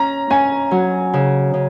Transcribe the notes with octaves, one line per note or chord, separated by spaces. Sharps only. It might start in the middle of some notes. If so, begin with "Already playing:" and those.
Already playing: C#4 A#5
C#4 G#5
F#3
C#3
C#3